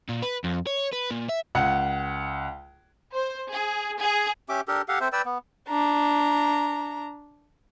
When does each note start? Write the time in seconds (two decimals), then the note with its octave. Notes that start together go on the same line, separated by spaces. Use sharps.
0.09 A#2
0.22 B4
0.44 F2
0.67 C#5
0.93 B4
1.11 A#2
1.29 E5
1.55 C#2 F#5
3.16 C5
3.52 G#4
3.99 G#4
4.49 C#4 G4 E5 D6
4.68 D4 G4 A4 A#4
4.88 G4 A4 F5 F#5
5.01 C4 A4 C5 E5
5.13 B4 D5 G5 E6
5.26 B3
5.69 D4 A#5